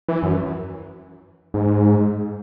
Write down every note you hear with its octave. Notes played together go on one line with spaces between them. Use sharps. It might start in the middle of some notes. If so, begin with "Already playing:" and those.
E3
F#2
G#2